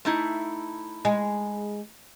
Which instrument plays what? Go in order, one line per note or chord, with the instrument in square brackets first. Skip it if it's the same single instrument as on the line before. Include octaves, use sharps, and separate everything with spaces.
[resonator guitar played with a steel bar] A3 D#4 E4
[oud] G#3